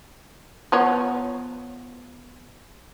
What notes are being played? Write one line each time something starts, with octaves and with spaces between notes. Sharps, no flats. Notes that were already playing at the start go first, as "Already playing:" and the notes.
F3 B3 C#5